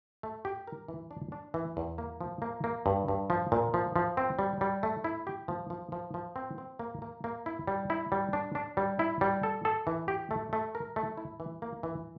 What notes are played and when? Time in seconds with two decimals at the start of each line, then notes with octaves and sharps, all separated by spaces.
0.23 A3
0.45 G4
0.67 A#4
0.88 E3
1.11 D4
1.32 D4
1.54 E3
1.77 E2
1.98 A#3
2.21 F3
2.42 A#3
2.64 A#3
2.86 G2
3.08 G2
3.30 F3
3.52 A#2
3.74 F3
3.96 F3
4.17 C4
4.39 G3
4.61 G3
4.83 A3
5.04 E4
5.27 G4
5.48 F3
5.70 F3
5.92 F3
6.14 F3
6.36 C4
6.58 C4
6.79 A#3
7.02 A#3
7.24 A#3
7.46 E4
7.67 G3
7.90 E4
8.12 G3
8.33 D4
8.55 D4
8.77 G3
8.99 E4
9.21 G3
9.43 A4
9.65 A4
9.87 E3
10.08 G4
10.31 A3
10.53 A3
10.75 A#4
10.96 A3
11.17 E4
11.40 E3
11.62 A#3
11.83 E3